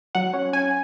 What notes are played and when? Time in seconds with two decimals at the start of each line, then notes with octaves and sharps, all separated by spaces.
0.15 F#3 F#5
0.34 C#4
0.53 C#4 G#5